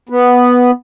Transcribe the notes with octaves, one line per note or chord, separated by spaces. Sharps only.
B3